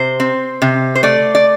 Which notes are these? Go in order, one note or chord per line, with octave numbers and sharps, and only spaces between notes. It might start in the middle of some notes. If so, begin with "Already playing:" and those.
Already playing: C3 C5
C4
C3
C5
A3 D5
D5